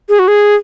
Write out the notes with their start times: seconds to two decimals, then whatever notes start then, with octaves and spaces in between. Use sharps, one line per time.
0.09 G#4
0.19 F#4
0.28 G#4